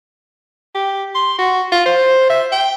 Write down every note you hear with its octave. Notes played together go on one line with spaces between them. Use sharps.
G4
C6
F#4
F4
C5
E5
G5